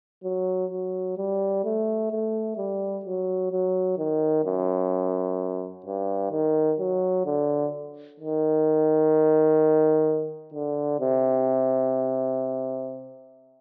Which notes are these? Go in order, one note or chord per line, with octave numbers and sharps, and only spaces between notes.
F#3
F#3
G3
A3
A3
G3
F#3
F#3
D#3
F#2
G2
D#3
F#3
D3
D#3
D3
C3